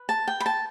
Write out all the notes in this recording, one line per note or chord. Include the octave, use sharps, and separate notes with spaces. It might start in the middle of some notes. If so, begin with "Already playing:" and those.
Already playing: B4
A5
G5
B5
A5